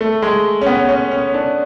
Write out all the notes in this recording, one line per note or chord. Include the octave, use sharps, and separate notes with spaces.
A3
G#3
C#4
B3
C#4
C#4
D4